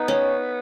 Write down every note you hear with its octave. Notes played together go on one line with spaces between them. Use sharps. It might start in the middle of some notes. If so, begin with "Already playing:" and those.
Already playing: B3 D#4
C#4